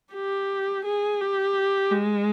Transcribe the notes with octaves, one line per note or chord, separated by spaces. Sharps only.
G4
G#4
G4
G#3